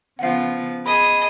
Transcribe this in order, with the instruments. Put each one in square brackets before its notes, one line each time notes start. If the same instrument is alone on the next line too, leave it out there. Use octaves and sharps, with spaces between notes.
[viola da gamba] C#3 F3 B3 [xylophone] F5 F#5
[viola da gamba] G#4 [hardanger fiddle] D#5 [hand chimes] B5